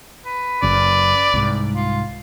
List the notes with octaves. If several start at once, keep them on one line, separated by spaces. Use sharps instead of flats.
B4
F#1 F#2 C#3 D5
C2 G#2
F4